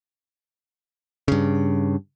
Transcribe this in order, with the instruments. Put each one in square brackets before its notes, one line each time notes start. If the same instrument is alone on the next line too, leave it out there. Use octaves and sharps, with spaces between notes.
[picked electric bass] G2 C#3